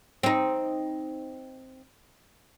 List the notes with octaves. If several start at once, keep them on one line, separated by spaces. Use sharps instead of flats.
C4 D#4